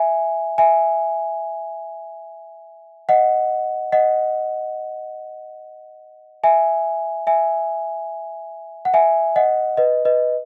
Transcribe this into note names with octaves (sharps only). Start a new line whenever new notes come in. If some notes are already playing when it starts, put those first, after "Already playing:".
Already playing: E5 G#5
E5 G#5
D#5 F#5
D#5 F#5
E5 G#5
E5 G#5
F#5
E5 G#5
D#5 F#5
B4 D#5
B4 D#5